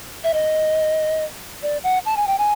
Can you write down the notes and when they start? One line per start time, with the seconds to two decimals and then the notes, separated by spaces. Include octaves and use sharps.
0.24 E5
0.33 D#5
1.62 D5
1.83 F#5
2.05 A5
2.17 G#5
2.27 G5
2.38 G#5